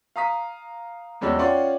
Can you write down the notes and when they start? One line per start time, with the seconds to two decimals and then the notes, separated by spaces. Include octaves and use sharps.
0.16 F5 A#5 D#6 B6
1.21 E2 G3 G#3 C#4 F#4 E6
1.39 C#4 F4 D5 F#5 G5 C6